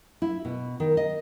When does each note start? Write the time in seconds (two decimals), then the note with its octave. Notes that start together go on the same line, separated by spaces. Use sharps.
0.22 E4
0.45 B2
0.80 D#3
0.97 D#5